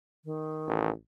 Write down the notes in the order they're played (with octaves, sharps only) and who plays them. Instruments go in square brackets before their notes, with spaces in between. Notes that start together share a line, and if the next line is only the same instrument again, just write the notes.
[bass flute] D#3
[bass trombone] A1